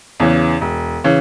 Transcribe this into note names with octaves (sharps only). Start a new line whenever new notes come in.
E2 C#3 E3
E1
C#3 E3